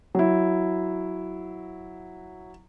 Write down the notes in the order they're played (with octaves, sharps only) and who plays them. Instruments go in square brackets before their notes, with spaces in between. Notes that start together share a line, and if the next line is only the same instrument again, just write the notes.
[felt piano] F#3 E4